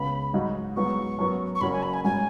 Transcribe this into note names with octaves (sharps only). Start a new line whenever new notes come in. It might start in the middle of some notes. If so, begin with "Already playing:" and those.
Already playing: C#2 C#3 B3 B5
G#2 F#3 D#4 F#4
G#2 F#3 B3 F#4 C#6
F#2 F#3 B3
C#6
F#1 F#2 F#3 C#4 F#4 B5
G#5
B5
G#5
G#2 G#3 C#4 F#4 G#5